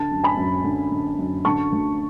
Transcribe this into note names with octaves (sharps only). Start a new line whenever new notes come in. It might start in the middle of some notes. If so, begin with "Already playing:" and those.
Already playing: D3 A5
F#2
G#5 B5
F#2
D3
D3
F#2
D3 A5 C#6
D2